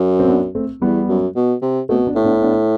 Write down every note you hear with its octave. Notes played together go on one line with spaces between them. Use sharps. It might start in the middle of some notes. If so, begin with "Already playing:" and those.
Already playing: F#2
C4
B3 D4
A3 C4
E2 G3 B3
F#2
B2
C3
B2 A3 C4
B3 D4
A2
B3 D4
B3 D4